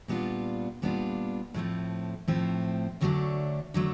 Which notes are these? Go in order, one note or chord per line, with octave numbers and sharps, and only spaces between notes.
A#2 G3 B3 D4 F4
A#2 G3 B3 D4 F4
A2 F3 A3 C4
A2 F3 A3 C4
D2 D3 F#3 A3 D4
D3 F#3 A3 D4